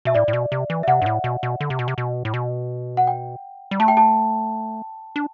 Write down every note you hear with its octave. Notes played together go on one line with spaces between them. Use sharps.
B2 E5
A2 D5
A2
B2
C3
E3
E5
C3 F#5
G2
A2
B2
B2
D3
C3
B2
C3
B2
A2
B2
F#5
G5
G3
A3 A5
G5
A5
D4